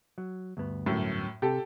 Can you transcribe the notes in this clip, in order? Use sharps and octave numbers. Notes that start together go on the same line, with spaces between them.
F#3
D2 G2 B3
F#2 A2
C3 G4 A4